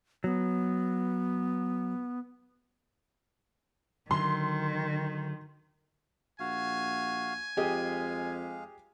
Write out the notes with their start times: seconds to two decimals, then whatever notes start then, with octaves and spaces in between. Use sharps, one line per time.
0.24 F#3 B3
4.11 D3 D#3 F#3 C6
6.40 A#1 F#4 F5 G#5
7.57 F2 G#3 G4 G#4 D#5 F5